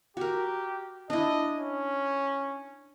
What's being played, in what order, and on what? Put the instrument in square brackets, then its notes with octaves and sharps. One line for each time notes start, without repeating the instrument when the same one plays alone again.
[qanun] F#4 A#4 [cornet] G4
[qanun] D4 E4 [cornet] D#5
[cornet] C#4